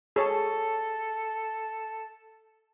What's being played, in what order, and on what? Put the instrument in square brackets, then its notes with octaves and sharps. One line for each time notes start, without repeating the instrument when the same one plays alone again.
[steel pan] G#4 C#5 A5 [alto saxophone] A4